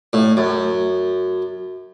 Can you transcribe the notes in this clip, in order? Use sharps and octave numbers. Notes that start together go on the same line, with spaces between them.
A2
F#2